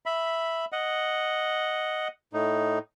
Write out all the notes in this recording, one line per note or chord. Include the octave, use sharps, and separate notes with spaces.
E5 B5
D#5 F#5
A2 D#4